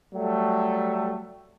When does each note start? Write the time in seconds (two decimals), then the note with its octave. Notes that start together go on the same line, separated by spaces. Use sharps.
0.14 F#3 G3 A3